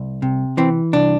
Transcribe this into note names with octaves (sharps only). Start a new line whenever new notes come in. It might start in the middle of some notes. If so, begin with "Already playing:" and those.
Already playing: C2
C3
E3 C4
C2 D4